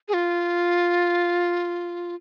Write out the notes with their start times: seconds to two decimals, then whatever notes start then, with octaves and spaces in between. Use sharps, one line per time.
0.08 G#4
0.14 F4